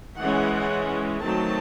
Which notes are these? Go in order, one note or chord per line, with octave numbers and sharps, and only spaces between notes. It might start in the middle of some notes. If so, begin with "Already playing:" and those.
E3 G#3 C#4 F#5
D#3 F#3 A3 C4 A5